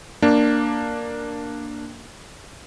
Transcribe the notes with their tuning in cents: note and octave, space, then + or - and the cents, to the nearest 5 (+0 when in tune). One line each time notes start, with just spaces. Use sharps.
A#3 +0 D4 +5